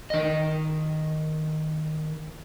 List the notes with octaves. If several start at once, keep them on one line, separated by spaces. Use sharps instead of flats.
D#3 D#5